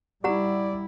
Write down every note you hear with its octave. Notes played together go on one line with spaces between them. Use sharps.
G3 E4 G4 D5 F#5 A#5